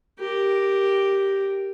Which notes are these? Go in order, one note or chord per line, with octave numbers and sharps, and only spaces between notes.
G4 A#4